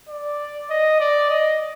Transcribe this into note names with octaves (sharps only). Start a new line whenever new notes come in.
D5
D#5
D5
D#5